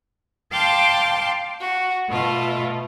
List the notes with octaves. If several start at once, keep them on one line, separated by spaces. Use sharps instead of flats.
F5 G5 A5 C6 D6
F#4
B2 A3 F4